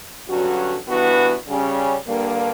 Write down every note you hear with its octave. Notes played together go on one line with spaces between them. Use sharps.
G2 D3 F#3 C#4 F#4
G2 E3 B3 F#4 B4
C#3 G3 C#4
G2 D3 G3 A#3